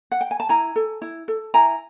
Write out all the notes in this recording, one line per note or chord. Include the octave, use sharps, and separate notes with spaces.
F#5
G5
G#5
A5
E4 G#5 A#5
A4
E4
A4
E4 G#5 A#5